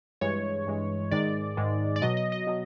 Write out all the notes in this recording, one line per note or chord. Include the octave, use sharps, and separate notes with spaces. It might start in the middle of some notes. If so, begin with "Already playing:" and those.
G2 E3 G#3 C#5
G2 E3 G#3
G#2 D#3 G#3 D5
G#2 D#3 G#3
D5
B2 F#3 D#5
D#5
D#5
B2 F#3